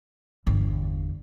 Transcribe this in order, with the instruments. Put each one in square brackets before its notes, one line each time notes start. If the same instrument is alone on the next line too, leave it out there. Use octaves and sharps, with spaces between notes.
[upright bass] G1 E2